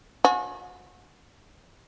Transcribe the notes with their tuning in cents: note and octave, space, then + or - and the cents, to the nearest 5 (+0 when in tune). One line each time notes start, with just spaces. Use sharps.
F#4 -35 G#5 +35